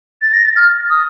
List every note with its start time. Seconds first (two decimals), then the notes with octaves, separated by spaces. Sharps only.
0.22 A6
0.33 A#6
0.44 A6
0.56 F6
0.90 D#6